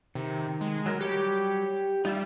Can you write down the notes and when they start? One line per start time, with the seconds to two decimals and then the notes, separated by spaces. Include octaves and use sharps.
0.15 C3 D#3
0.61 G#3
0.86 F#3 A#4
1.01 F#3 G3 G4 C#5
2.05 G3 D#4 F4 E5